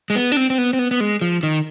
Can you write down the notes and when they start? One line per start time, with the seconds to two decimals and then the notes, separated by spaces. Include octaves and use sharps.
0.10 G#3
0.15 B3
0.32 D4
0.37 C4
0.50 C4
0.58 B3
0.73 C4
0.79 B3
0.91 B3
1.00 G#3
1.21 F3
1.43 D#3